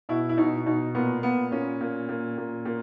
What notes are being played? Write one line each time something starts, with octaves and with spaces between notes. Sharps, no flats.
B2 E4
E4
B2 D#4
B2 D#4
A#2 B3
A#2 B3
A#2 C#4
A#2
A#2
A#2
A#2